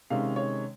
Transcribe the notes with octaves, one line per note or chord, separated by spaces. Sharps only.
C3 D#3 G#3 C#4 F5
C#5